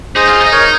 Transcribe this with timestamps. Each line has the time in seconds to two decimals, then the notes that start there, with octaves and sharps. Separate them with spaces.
0.15 D#4 G#4 C5
0.28 F4
0.40 D#4 D#5
0.52 A#4 C#5